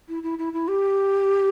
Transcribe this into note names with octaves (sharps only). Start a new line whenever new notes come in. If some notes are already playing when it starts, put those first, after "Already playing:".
E4
E4
E4
E4
G4